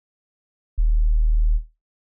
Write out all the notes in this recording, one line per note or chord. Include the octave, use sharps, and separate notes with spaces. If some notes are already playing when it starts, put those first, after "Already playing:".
D#1